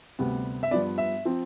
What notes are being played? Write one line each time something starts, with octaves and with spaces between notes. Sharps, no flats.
D2 C3 G3 B3
E5
G2 F3 B3 D5
E5
F3 C4